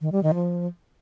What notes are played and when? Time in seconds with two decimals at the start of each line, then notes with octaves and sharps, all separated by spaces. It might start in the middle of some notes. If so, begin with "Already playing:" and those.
0.01 D#3
0.12 G3
0.23 D#3
0.34 F3